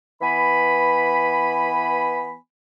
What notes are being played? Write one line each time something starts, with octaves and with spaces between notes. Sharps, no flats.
E3 B3 G#5 B5